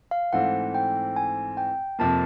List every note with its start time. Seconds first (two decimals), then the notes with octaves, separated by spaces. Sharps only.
0.11 F5
0.32 G#2 E3 A3 C4 F#5
0.75 G5
1.16 G#5
1.57 G5
1.99 F2 C3 F3 A#3 A5